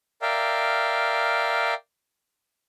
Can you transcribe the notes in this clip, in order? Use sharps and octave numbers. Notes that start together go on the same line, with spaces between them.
A#4 D5 E5 F5 G5